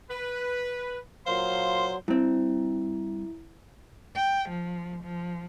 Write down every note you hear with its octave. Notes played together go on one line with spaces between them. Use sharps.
B4
A#2 F#3 C5 F5 C6
G2 C4 E4
G5
F3
F3